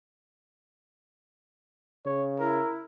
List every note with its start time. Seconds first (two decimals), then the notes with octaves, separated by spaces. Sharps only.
2.06 C#3 C#5
2.40 E4 A#4